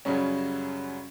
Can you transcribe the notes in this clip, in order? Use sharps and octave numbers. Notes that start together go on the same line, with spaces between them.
F#2 C#3 F#3 G3 C#4